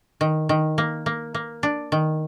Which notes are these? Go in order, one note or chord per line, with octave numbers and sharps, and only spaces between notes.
D#3
D#3
A#3
A#3
A#3
D4
D#3